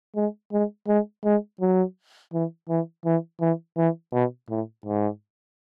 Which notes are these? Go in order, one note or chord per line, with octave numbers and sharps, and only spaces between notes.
G#3
G#3
G#3
G#3
F#3
E3
E3
E3
E3
E3
B2
A2
G#2